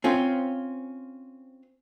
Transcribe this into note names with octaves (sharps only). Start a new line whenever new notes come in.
C4 C#4 F4